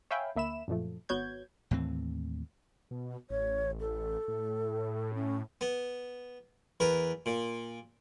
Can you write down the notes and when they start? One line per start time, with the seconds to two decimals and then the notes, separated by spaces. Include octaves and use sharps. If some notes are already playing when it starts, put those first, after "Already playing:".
0.11 C#5 E5 F5 G5 G#5 B5
0.36 D2 A#3 E5 B5 E7
0.68 F#2 A#2 F3 A3
1.09 G#1 B3 F#4 C#5 G6 G#6
1.71 D#2 A2 E3 C4
2.91 B2
3.30 A1 C#5
3.80 A4
4.28 A2
5.14 C#4
5.61 B3
6.80 E2 A#4 B4
7.26 A#2